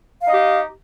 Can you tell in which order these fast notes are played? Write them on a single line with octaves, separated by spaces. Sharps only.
F5 D#4 D#5 G4